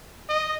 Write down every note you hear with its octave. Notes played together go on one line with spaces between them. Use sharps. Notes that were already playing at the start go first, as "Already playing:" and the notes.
D#5